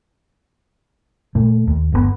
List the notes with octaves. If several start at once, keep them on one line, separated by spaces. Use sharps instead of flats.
A#2 A3
D#2
G1 B2 B3